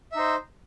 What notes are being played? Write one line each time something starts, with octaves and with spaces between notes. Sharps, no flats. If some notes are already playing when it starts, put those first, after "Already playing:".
D#4 C5 E5